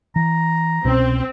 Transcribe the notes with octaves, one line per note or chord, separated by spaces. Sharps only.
E3 A#5
C2 B2 C4 C#4